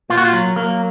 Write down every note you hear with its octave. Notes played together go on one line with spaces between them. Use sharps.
A#2 F4
F#4
F4
F#3
F#3 A#3